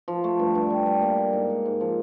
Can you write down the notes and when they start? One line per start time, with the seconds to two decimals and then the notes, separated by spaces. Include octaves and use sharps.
0.08 F3
0.24 A3
0.39 G2
0.55 G2
0.70 G3
0.86 G3
1.02 A#3
1.18 A#3
1.33 G#2
1.50 G#2
1.66 G#2
1.80 F3